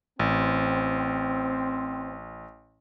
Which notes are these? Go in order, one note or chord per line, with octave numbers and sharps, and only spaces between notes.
A1 C4